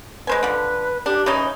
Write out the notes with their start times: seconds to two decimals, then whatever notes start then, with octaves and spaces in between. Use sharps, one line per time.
0.27 G#3 B4 C5 G#5
0.43 D3 F3
1.06 D4 G4
1.26 C#3 E3 D#4 C#5